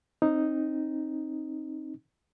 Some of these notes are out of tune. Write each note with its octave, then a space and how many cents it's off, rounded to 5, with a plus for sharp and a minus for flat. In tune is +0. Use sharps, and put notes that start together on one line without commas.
C4 +30 D#4 +0